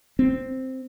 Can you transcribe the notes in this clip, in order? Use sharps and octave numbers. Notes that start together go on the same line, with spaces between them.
C4